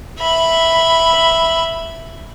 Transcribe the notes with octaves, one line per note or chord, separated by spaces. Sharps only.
E5 B5